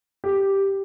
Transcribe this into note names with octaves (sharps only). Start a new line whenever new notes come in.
G4